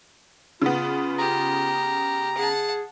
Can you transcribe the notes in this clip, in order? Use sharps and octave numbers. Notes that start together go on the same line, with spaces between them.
C#3 B3 F4
G4 A#5
G#4 F#5 A5